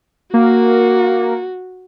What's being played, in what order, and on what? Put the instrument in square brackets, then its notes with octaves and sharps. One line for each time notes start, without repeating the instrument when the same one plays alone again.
[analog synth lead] A#3 [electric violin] F#4